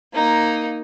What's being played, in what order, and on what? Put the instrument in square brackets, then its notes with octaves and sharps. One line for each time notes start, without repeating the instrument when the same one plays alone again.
[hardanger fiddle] A#3 D#4